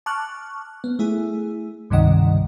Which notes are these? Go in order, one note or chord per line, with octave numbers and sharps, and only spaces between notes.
A5 C#6 D6 F6 F#6
B3
A3 E4 G#4
C#2 G2 C3 D#3 D#5 F#5